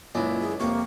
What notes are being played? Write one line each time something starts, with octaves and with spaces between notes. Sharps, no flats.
C#2 F#2 A#2 D4 E4 D#5
G#4
F2 C3 A#3 C#6